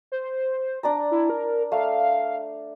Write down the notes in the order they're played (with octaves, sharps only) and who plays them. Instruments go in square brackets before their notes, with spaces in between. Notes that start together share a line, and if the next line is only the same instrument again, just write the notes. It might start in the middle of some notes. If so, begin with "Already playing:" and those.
[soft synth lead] C5
[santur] D4 D5 A#5
[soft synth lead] E4
A#4
[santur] A3 [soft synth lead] F5